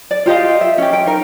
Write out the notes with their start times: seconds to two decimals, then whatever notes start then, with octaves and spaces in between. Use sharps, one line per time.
0.11 D5
0.26 F4 G4 D#5 F5
0.61 E5
0.78 C#4 G4
0.93 G5
1.06 D#4 A#4